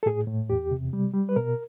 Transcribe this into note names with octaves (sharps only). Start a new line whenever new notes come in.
A4
A2 G#4
A2
E2 G4
C3
G3
G3
B4
B2 A#4